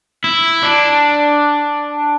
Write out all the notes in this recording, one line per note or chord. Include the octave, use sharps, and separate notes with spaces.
E4
D4